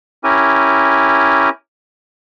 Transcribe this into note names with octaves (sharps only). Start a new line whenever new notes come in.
C#4 E4 G4 A#4 G#5